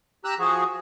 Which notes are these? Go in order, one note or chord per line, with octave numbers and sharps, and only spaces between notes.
G4 A#5 E6 F#6
F3 F#4 G#4